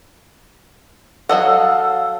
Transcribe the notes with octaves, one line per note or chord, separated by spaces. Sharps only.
F#3 A4 D#5 F5 F#5